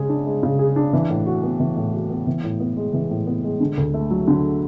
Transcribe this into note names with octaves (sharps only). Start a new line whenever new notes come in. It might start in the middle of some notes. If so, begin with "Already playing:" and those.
Already playing: C#3 G#3 G#4
D4
G#3
C#3
G#4
D4
E3
A2
F#4
B3
E3
A2
F#4
B3
E3
A2
B3
G#3
E3
A2
B3
G#3
D3
D2
A3
F#3
D3